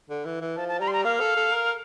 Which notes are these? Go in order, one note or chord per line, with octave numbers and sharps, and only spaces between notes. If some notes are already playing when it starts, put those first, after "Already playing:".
D3
E3
E3
F3 A5
A5
G3 A#5
C6
A#5
A#3 F5
A4
A4
A#4